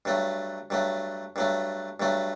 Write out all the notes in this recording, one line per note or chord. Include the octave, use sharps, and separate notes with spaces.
G2 F#3 A3
G2 F#3 A3
G2 F#3 A3
G2 F#3 A3